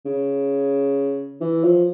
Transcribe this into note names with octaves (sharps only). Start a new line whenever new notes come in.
C#3
E3
F3